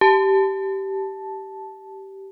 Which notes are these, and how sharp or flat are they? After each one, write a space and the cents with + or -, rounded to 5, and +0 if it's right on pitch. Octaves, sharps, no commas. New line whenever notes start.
G4 -15 A5 -10